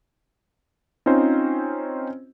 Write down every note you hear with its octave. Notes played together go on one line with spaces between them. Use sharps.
C4 C#4 D#4 F4 C5